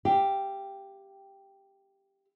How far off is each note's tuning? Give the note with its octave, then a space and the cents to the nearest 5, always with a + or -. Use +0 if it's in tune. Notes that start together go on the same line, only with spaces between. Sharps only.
G4 +0 F5 -35